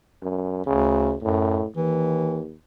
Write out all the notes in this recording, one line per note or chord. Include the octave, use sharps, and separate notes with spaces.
F#2
D2 C#3
F#2 A2
D#2 E3